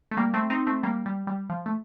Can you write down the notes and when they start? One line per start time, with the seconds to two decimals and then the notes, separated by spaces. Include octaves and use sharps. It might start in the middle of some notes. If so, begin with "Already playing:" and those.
0.11 A3
0.17 G3 A#3
0.34 A3 C4
0.50 C4 D#4
0.67 A3 C4
0.83 G3 A#3
1.06 G3
1.27 G3
1.50 F3
1.66 A3